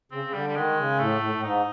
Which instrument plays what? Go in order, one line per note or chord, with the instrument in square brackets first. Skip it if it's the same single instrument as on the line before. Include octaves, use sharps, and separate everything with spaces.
[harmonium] C#3 [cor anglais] C4
[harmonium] C#3
[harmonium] D3 [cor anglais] G3
[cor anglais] G3
[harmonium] D#3 [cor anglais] G#3
[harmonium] C#3
[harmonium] A2 [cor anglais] A3
[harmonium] A2
A2
[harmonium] G#2 [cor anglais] D#4